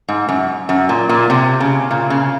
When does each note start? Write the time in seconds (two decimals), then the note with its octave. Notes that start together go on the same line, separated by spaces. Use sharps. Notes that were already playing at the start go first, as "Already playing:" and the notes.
0.09 G#2
0.29 F#2
0.69 F#2
0.89 A#2
1.09 A#2
1.30 C3
1.60 C#3
1.91 A#2
2.10 C#3